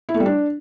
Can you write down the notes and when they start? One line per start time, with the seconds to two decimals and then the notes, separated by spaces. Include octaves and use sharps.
0.09 E4
0.14 A3
0.20 G3
0.26 D4